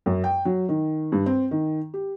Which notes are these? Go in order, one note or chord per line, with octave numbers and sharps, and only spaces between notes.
F#2
G5
F#3
D#3
G2
C4
D#3
G4